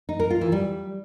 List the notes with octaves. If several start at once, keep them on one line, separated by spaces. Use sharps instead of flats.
D#4
A#4
F4
E3
G3